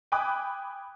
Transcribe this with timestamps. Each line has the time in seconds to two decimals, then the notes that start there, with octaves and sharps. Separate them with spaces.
0.12 G5 G#5 B5 D6 D#6 F#6